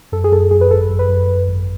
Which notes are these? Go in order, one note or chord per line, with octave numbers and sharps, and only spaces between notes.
F#2 A4
G#4
F#2 A4
F#2 G#4
B4
G#1 A4
F#2
B4
F#2
F#2
G#1